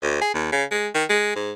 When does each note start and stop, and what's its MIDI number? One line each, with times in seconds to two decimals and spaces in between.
0.03 0.17 38
0.22 0.30 68
0.34 0.50 39
0.52 0.64 49
0.71 0.88 56
0.95 1.04 51
1.10 1.35 56
1.36 1.52 44